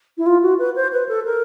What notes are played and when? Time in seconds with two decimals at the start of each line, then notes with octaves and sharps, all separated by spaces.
0.17 E4
0.26 F4
0.42 F#4
0.58 B4
0.75 C5
0.92 B4
1.08 A4
1.25 A#4